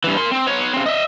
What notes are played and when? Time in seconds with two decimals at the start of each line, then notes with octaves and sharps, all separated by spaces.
0.04 G2 E3
0.18 A#4 C6
0.32 C4
0.47 B3 C#5
0.74 C#3 C4
0.86 D#5 E5